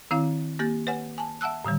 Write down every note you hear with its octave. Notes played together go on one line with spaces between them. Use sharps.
D#3 C4 E4 F5
A#3 G4 G6 A6
B4 C#5 F#5 G#5
G#5 A5
E5 F#5 A5 E6 F#6
A2 D3 D#3 G3